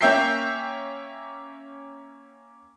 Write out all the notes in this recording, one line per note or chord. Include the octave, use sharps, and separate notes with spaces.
A#3 C#4 E5 G5 G6 C7